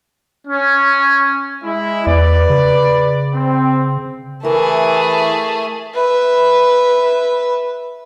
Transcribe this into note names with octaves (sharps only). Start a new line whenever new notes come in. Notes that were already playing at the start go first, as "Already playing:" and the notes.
C#4
G#3 E4
E2 B4 D5
C#3
C4
E3 A3 G#4 A#4
B4 E5